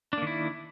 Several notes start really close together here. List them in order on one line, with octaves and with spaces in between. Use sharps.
D4 A#3 D#3 E4